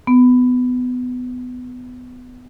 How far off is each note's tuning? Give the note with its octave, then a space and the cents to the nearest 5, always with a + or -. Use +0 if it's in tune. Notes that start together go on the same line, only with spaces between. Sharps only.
B3 +20